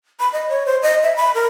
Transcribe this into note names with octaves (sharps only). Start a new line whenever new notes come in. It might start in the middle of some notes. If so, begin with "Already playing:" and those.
B5
D#5
C#5
C5
D#5
E5
B5
A#4